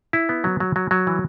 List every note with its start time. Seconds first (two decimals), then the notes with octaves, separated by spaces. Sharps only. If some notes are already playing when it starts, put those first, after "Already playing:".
0.13 E4
0.29 B3
0.44 F#3
0.60 F#3
0.76 F#3
0.91 F#3
1.07 E3